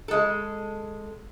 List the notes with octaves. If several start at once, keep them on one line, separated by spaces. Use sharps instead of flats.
G#3 A4